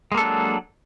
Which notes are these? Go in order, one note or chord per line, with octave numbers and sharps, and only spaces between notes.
F#3 G#3 A#3 D4 A4